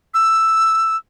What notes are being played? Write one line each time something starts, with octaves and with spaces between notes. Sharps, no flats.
E6